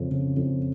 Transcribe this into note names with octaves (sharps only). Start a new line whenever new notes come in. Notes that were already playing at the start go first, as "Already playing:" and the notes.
Already playing: F2 C#3
C#3
F2